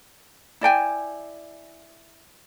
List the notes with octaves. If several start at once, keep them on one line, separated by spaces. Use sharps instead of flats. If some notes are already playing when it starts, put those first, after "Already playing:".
E4 D5 G5 G#5